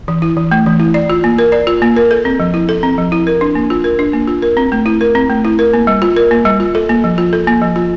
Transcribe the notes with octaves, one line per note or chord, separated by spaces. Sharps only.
E3
E4
E3
A3
E3
E4
D5
F4
A#3
A#4
D5
F4
A#3
A#4
A4
C4
F3
E4
A4
C4
F3
E4
A#4
D4
A#3
F4
A#4
D4
A#3
F4
A#4
C4
A3
E4
A#4
C4
A3
E4
A#4
A#3
G3
F4
A#4
A#3
G3
F4
A4
A#3
F3
F4
A4
A#3
F3
F4